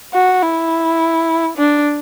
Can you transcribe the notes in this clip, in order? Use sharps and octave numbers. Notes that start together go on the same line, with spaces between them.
F#4
E4
D4